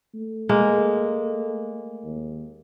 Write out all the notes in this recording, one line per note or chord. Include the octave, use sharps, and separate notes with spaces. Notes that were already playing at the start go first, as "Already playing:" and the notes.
A3
G#3 A#3
D#2